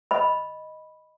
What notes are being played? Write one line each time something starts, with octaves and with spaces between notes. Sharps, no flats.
D#5 B5